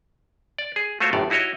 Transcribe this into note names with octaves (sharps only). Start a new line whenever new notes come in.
D5
G#4
A3 F4 F#4 C5 C#5
G1 F#2 A2 D5
D#4 E4 F#4 C#5 D#5